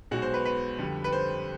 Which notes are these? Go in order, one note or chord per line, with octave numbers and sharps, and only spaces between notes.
B1 B2 G#3 F#4
C5
B4
B4
F2 D3 G3
B4
C5